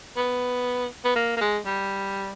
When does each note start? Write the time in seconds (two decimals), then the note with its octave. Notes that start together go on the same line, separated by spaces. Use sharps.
0.16 B3
1.05 B3
1.16 A#3
1.37 A#3
1.41 G#3
1.66 G3